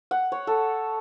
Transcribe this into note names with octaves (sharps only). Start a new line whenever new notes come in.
F#5
C#5
A4